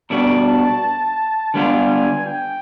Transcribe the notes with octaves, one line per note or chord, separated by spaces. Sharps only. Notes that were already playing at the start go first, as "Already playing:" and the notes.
B2 G3 B3 D4 F#4 A5
D3 G3 B3 D4 F4 G#5
G5